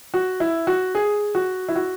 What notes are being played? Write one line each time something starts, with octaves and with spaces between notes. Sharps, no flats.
F#4
E4
F#4
G#4
F#4
E4
F#4